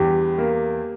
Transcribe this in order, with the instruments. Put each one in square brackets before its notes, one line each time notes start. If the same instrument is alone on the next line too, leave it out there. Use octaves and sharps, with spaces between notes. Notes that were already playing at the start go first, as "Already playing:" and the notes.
Already playing: [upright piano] E2 G2 [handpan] G4
[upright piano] A#3